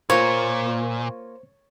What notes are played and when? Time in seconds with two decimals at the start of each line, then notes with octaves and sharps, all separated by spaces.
0.10 A#2 A#3 F4 C5 C#5